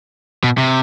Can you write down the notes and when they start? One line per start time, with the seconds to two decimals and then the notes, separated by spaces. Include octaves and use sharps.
0.44 B2
0.58 C3